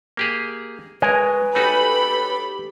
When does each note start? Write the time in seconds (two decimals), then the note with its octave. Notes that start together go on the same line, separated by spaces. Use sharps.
0.17 A#3 G4 G#4
1.02 G#3 A#4 B4 C#5 G#5
1.55 A3 D#4 F#4 G4 A4 B5